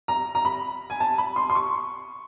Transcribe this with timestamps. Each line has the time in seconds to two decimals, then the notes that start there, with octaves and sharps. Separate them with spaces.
0.08 A#5
0.35 A#5
0.45 B5
0.90 G#5
1.00 A5
1.18 B5
1.36 C6
1.50 C6
1.55 C#6